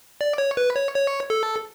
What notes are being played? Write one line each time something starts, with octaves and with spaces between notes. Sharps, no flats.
D5
C#5
B4
C#5
C#5
A4